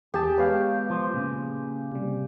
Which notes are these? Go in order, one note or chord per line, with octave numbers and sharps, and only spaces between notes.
E2 G4 G#4 A5
G#3 B3 B4 C#5 F5
F3
A#2 C#3
C3 G3